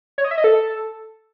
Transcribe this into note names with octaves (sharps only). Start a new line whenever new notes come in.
C#5
D#5
E5
D#5
A4